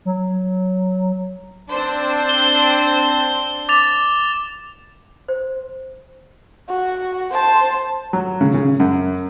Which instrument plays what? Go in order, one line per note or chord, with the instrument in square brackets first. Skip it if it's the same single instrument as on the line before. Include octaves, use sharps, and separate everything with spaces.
[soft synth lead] F#3
[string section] C4 D4 C5
[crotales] G7
D6 A6 F7
[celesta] C5
[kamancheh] F#4
C5 A5
[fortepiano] F#3
C#3
C#3
F#2